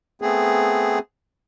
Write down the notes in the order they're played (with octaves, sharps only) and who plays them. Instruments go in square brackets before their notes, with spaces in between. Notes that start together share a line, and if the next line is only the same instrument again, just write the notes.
[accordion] A3 B3 C4 G#4